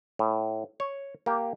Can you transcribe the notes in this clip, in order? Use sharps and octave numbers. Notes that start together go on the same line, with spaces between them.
A2
C#5
A#3 G4